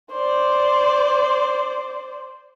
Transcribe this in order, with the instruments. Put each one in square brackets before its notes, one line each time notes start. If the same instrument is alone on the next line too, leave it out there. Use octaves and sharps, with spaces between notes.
[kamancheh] C5 D5